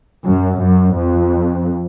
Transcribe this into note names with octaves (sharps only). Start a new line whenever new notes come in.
F#2
F#2
F2